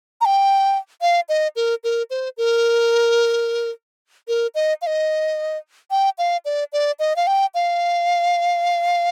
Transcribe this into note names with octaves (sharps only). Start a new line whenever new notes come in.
A#5
G5
F5
D#5
A#4
A#4
C5
A#4
A#4
D#5
F5
D#5
G5
F5
D5
D5
D#5
F5
G5
F5